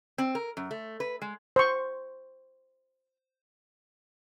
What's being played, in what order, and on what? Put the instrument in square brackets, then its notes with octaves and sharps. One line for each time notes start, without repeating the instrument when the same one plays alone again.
[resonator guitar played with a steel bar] C4
A#4
F#2
A3
B4
G#3
[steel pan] C5 C#6